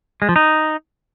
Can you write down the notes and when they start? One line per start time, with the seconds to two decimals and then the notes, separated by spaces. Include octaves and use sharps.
0.22 G#3
0.29 F3
0.36 D#4